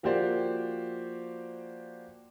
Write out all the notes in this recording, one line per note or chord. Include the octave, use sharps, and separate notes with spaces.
F3 A#3 F#4 G4 C5 D5